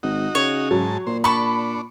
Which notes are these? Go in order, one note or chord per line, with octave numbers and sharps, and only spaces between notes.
G#1 D#4 F#4
C#3 C#5
G#2 F#3 A5
A#2 C5
D4 A5 B5 C#6